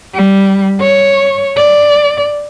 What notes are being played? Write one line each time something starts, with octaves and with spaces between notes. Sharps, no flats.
G3
C#5
D5